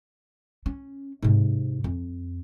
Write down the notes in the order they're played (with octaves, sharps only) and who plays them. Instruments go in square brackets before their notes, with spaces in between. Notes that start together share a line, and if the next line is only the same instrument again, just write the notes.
[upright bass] C#4
G#2 C3
F2